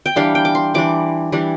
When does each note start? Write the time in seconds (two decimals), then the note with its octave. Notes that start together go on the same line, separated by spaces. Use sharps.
0.06 G5
0.16 E3 G3 D4 F5
0.35 G5
0.45 D6
0.55 C6
0.74 E3 G3 D4 D6
1.32 E3 G3 D4